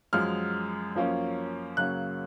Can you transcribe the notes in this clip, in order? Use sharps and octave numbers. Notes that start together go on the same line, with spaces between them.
F#2 F3 G#3 F6
F#2 F3 A#3 C#4
F#2 C#3 F#3 A#3 C#4 F#6